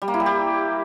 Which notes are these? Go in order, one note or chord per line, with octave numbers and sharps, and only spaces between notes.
G3
A#3
E4
G3
G4